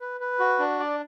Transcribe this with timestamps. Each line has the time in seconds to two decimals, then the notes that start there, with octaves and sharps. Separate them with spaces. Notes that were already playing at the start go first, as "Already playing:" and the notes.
0.01 B4
0.20 B4
0.40 F#4
0.59 D4
0.80 D5